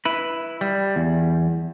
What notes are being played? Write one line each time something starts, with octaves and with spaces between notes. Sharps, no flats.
E4 B4
G3
E2